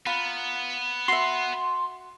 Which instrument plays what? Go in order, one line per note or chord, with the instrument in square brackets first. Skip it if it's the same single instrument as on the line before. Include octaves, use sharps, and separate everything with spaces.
[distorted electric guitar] B3 [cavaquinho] F4 A#5 B5
[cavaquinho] F#4 E5 [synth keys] C6